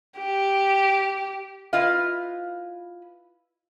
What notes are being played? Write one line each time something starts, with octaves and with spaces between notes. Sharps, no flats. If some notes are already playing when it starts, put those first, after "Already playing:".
G4
E4 F4 B4 D#5 F5